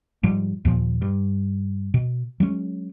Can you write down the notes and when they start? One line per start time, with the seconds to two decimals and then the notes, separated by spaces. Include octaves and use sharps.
0.23 G#2 F3 G3
0.65 D#2 A#2 F3
1.02 G2
1.94 B2
2.40 F#3 G#3 C#4